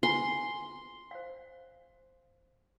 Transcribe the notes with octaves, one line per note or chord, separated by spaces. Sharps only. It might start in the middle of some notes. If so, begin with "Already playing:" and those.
F4 G#5 C6
C5 F5